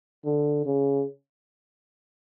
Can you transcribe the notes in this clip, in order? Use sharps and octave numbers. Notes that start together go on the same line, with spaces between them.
D3
C#3